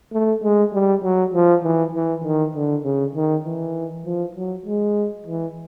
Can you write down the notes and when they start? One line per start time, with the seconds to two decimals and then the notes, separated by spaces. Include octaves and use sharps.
0.13 A3
0.43 G#3
0.73 G3
1.03 F#3
1.34 F3
1.63 E3
1.94 E3
2.24 D#3
2.55 D3
2.84 C#3
3.15 D#3
3.44 E3
4.05 F3
4.35 F#3
4.66 G#3
5.26 E3